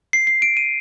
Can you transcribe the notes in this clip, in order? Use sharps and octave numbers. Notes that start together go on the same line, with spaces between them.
C7
C7
D7
D#7